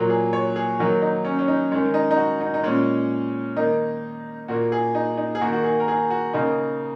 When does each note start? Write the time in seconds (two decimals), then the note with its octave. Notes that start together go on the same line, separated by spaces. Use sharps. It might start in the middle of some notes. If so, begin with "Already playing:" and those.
Already playing: A#2 F#3 A#3
0.10 G#4
0.33 C#5
0.56 G#4
0.79 D#3 F#3 A#3 F#4
1.02 D#4
1.25 C#4
1.39 C#4
1.48 D#4
1.72 D#3 G#3 C#4
1.94 D#4
2.11 D#4
2.17 F#4
2.41 D#4
2.54 D#4
2.63 A#2 G#3 C#4
3.57 D#3 A#3 D#4
4.48 A#2 A#3 F#4
4.72 G#4
4.95 D#4
5.17 D#4
5.35 G#4
5.41 D#3 A#3 F#4
5.53 F#4
5.64 G#4
5.80 A#4
5.88 G#4
6.11 F#4
6.34 C#3 A#3 D#4